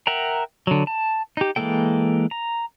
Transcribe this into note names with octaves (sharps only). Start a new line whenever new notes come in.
A#4 E5 F#5 G5 A#5
D3 F#3
A5
D#4 G4
E3 G#3 A#3 A4 G5
A#5